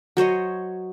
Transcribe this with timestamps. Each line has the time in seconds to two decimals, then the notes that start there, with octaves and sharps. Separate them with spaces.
0.17 F#3 C5 C#5 D#5